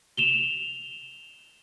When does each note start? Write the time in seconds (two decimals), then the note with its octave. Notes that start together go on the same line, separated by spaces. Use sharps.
0.17 E7 F7 G7